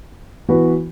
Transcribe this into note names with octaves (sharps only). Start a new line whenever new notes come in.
E3 B3 F#4 B4